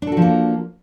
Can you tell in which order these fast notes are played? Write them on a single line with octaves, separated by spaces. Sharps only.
D4 A4 F#4 F3 A#3